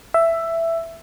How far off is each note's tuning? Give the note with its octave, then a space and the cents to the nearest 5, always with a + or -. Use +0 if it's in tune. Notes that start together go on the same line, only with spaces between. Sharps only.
E5 +10